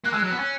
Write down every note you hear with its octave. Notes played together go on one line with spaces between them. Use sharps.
A#3 F#6
G#3 E6
F#3 F#6
B3
C#4